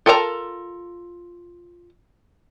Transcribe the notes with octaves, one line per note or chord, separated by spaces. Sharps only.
F4 A4 A#4 D5 A#5